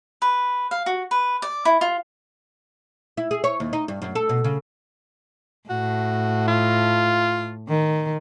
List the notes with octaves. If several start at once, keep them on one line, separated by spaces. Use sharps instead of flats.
B4
F5
F#4
B4
D5
E4
F4
E4
G#4
C#5
D#2
D#4
G2
F#2
A4
B2
C#3
A2 F#4
F4
D#3